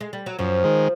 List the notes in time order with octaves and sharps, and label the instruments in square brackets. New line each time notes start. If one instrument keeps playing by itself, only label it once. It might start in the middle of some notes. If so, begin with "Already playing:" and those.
[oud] G#3
G3
F#3
[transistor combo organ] F#2 [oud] F3
[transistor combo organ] D#3 G#3